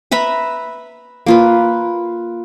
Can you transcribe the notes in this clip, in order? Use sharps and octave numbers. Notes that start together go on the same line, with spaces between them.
B4 E5 A#5 B5
A#3 F4 B4